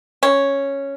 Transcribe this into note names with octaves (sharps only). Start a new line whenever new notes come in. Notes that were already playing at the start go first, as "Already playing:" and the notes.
C#4